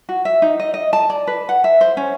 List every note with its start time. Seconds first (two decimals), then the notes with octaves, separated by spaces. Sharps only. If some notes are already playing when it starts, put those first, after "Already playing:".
0.09 F#4
0.25 E5
0.42 D#4
0.59 D#5
0.74 D#5
0.93 A5
1.10 D5
1.27 B4
1.49 F#5
1.64 E5
1.81 C5
1.97 C#4